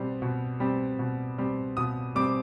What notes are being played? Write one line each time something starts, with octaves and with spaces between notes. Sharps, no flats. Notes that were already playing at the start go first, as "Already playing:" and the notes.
Already playing: B2 G3 C4
B2
G3 C4
B2
G3 C4
B2 D#6
G3 C4 D6